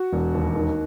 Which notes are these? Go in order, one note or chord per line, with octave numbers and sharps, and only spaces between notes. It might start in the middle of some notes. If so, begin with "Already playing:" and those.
Already playing: F#4
E1
D#2
D#3